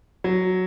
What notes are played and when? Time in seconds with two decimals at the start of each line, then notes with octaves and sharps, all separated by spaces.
0.24 F#3